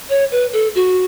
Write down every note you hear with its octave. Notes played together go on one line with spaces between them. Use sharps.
C#5
B4
A4
F#4